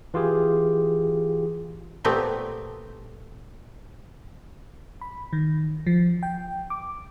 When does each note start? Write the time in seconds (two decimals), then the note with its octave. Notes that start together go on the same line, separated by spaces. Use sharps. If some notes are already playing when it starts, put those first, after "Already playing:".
0.14 E3 F4 G4 G#4
2.04 A#2 A3 B3 C4 G4
5.01 B5
5.33 D#3
5.87 F3
6.23 G5
6.70 D6